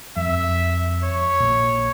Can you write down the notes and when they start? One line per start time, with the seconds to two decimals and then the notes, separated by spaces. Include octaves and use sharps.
0.16 F2 E5
1.03 C#5
1.40 A#1